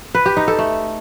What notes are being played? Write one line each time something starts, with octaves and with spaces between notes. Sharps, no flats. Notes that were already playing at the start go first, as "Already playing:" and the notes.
B4
G4
D#4
A4
A3